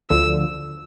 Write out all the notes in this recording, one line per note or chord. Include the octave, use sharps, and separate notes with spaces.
D2 D3 F3 E6